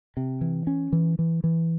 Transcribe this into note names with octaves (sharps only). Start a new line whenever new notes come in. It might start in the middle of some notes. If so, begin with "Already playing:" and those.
C3
E3
C#4
E3
E3
E3